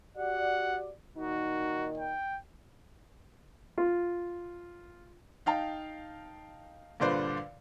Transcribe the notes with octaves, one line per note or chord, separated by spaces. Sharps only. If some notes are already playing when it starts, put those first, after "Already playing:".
F#4 G4 D5 F#5
A#2 D#3 D#4 F#4
G5
F4
D#4 F5 G5 A5
G2 A#2 D3 B4 C5 D5